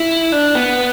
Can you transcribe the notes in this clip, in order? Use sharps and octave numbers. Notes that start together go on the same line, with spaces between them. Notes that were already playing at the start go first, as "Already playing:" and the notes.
Already playing: E4
D4
B3